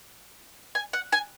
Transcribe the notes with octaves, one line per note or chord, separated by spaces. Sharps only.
G#5
F#5
G#5